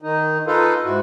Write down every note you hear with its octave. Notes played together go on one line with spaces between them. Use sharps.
D#3 D#4
D#4 F4 A4 B4 F5
G#2 E4 F#4